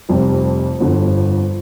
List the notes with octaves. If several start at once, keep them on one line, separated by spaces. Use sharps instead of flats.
F1 F2 C3 G3
G1 F2 D3